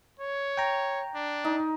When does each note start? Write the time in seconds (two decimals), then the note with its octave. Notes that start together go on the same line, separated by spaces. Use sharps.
0.20 C#5
0.58 G5 A#5
1.15 D4
1.45 D#4